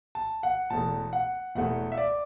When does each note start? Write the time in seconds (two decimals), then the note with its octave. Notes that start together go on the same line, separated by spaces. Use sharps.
0.15 A5
0.43 F#5
0.70 E1 E2 E3 A3 A5
1.13 F#5
1.55 E1 E2 E3 A3 F#5
1.92 E5
1.98 D5